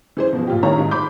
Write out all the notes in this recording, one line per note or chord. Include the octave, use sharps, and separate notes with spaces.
E3 G#4 C5
B2 F3
A#2 F4 G4
A1 D#3 E4 C#5 F5 A#5
G#2
B5 C6 D6 G6